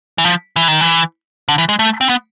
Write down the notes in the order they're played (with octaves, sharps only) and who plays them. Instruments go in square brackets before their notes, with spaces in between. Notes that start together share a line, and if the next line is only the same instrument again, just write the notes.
[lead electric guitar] E3
F3
E3
D#3
E3
D3
E3
G#3
A3
C4
B3